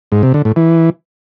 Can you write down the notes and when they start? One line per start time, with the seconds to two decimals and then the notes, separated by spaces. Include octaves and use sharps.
0.12 G#2
0.23 C3
0.34 D3
0.45 A2
0.56 E3